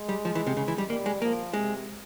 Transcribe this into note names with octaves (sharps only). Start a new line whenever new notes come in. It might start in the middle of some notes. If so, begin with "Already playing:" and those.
Already playing: G#3
G3
F3
E3
C3
C#3
E3
G3
G3 A#3
G#3
F3 A#3
C3 G#3